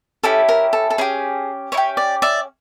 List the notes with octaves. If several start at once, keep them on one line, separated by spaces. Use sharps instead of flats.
C#4 E4 G4 A4
A#4
A4
A4
C#4 E4 G4 G#4
C#4 E4 C#5
G4
D5
D5 E5